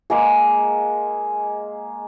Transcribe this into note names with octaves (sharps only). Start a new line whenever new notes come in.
G#3 A#3 G#4